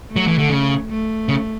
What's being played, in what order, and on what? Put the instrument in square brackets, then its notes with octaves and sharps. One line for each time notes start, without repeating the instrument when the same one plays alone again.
[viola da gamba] A3
[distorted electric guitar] F#3
E3
D3
C#3
[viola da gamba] A3
[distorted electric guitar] C#3